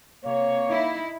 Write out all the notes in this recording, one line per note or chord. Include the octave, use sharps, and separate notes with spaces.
C3 A#3 C#5
D#4 E4